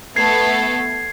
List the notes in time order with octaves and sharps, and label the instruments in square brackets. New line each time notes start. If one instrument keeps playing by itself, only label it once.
[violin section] A3 B3 A4 [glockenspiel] G#6 C7